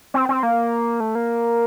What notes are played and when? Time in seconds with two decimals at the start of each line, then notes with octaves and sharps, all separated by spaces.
0.14 C4
0.29 C4
0.43 A#3
1.00 A3
1.15 A#3